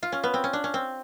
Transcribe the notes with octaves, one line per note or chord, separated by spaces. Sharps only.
F4
C#4
B3
C4
C#4
D4
C#4
C4